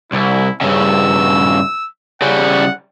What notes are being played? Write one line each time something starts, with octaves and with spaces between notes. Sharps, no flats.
C2 E4
G2 C#3 E6
C#3 G3 F#5